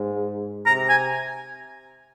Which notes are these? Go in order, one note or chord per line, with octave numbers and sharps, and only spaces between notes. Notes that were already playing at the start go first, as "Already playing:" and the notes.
Already playing: G#2
C3 A#5
G#5